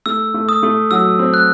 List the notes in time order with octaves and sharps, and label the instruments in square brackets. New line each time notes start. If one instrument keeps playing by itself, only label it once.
[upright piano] A3 [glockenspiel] E6
[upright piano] A3
[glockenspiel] D#6
[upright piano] A3
[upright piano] F#3 [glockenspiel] E6
[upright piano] C4
[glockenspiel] F#6